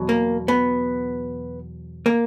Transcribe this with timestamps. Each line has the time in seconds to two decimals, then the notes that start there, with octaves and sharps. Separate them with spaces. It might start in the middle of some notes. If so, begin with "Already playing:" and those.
Already playing: E2 B2 F#3
0.09 A#3
0.48 B3
2.06 A#3